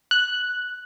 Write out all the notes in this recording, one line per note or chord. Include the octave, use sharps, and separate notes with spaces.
F#6